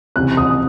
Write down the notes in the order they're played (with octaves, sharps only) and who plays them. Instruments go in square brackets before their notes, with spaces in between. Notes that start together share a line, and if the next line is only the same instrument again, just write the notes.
[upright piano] C#2 C3 E3 [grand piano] F#6
[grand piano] D#6